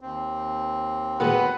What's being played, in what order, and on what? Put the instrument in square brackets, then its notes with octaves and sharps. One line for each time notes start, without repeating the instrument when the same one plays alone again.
[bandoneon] D#2 C4
[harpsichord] A#2 D#3 G#3 [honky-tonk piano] F#4 B4 [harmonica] F#5 B5